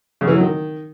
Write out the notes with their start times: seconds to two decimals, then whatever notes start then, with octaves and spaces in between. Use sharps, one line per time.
0.21 C#3
0.27 E3
0.34 F#3
0.40 D#3